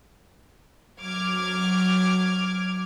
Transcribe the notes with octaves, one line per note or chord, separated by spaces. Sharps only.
F#3 D6 F6 G#6